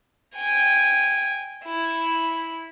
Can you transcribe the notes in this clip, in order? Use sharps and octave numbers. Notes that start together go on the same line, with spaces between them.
G5 G#5
E4